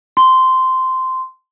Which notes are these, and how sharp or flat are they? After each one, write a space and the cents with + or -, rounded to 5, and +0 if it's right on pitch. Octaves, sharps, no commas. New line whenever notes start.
C6 -10